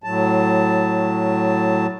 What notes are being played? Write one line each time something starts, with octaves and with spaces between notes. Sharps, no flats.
A2 F#3 A5